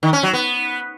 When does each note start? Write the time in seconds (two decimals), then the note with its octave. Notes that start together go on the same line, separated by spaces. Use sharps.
0.03 D#3
0.13 C#4
0.23 F#3
0.33 B3